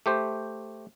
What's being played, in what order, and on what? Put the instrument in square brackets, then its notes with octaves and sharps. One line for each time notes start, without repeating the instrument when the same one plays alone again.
[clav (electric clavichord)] A3 G4 C5